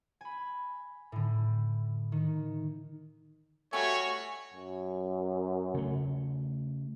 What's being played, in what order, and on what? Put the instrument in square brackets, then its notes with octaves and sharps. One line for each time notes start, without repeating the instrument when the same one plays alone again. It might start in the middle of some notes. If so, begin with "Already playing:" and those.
[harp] G#5 B5
A2 D3
D#3
[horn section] G3 A3 [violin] F#4 [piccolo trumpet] C#5 [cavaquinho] F5 G#5
[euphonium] F#2
[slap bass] C#3 A3